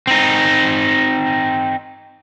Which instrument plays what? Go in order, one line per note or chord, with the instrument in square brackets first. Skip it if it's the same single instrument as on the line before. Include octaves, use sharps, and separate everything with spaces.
[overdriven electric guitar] C4 D#4